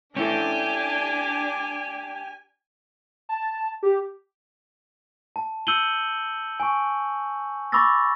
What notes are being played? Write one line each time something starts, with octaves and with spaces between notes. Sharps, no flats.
C#4 D4 E4 G4 A4 G#5
A5
G4
A5
E6 G6 C#7 D#7 F#7 G7
G#5 C#6
B5 C#6 D6 E6 A6 A#6